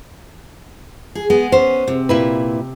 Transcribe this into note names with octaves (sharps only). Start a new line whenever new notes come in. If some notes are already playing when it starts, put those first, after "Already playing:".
G#4
G#3 B3
B3 C#4 C5
C3
A#2 E4 B4